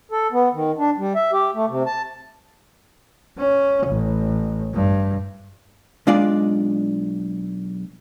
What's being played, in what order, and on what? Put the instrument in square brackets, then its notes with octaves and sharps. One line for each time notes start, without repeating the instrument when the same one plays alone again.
[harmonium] A4
B3
D#3
D4
G3
E5
G4
A3
C3
A5
[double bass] C#4
A1
G2
[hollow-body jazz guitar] B1 G#3 D4 F4 D5